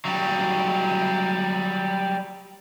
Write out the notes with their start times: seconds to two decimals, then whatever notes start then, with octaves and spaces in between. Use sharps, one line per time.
0.05 F#3 G3